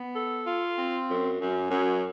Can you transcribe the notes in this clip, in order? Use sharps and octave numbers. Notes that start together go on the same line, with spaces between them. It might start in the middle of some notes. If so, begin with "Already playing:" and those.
Already playing: B3
A4
F4
C4
F#2
F#2
F#2